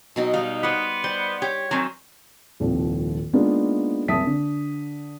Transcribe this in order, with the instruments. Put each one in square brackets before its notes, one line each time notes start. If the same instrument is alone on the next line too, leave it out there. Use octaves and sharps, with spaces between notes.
[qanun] B2 F#3 D#4 [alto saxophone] C4
[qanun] G3 [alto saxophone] D#4 [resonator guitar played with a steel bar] F5
[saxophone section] B3 [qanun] G4 C5
[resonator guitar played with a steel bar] G3 [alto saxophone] C5 [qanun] C6
[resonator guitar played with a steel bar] G4 [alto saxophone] C#5
[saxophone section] D#3 [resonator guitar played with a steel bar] F#3 C4 [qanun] G#5
[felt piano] D#1 C2 D#3 F3
G#3 A#3 B3 D4 D#4 F4
F#1 C2 E5 A5 D#6 B6
D3